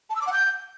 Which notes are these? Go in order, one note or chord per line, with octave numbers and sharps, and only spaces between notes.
A5
E6
D6
F#5
G6